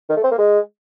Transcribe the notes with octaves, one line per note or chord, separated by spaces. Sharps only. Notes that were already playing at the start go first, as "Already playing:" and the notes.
D#3
A3
C4
A#3
G#3